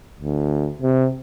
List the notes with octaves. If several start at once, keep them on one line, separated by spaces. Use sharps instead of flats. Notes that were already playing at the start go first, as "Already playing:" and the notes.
D2
C3